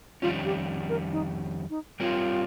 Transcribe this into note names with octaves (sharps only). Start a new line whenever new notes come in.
F2 D#3 G3 C#4 F4
G4
A#4
D#4
D#4
G3 C4 F4 G4 A#4 C#5